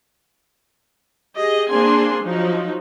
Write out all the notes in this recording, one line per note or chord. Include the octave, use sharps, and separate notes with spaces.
G4 G#4 D#5
A#3 C4 D4 G#4 G#5 C6
F3 F#3 D#4